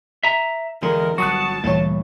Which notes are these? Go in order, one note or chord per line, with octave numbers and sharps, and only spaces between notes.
E5 A#5
E2 D3 G#3 A#4
G1 F#3 F#4 A5 C#6 D#6 F#6
D2 G2 A#2 E3 A3 C#5